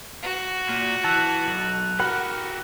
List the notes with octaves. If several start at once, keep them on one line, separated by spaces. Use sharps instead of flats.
F#4
A#2 F6 D#7 E7
E3 A5 E6 F#6 F7
B1
F#4 G4 A#4 F#5 B5